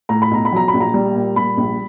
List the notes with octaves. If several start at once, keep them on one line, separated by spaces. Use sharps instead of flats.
A2 A#5
B5
B1 A#5
B5
F#3 A#5
B5
A#1
A#5
G3
A#2
G3 B5
A#1